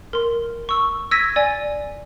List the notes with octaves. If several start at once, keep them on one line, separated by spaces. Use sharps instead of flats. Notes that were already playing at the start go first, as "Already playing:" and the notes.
A#4 C6
C#6 E6
E6 G#6 A#6 B6 D#7
D5 G#5